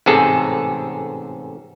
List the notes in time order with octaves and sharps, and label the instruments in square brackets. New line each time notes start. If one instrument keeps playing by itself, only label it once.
[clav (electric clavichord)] A1 G#2 C3 G#4 A4